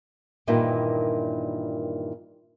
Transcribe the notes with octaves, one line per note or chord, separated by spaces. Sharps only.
G2 A#2 D#3 E3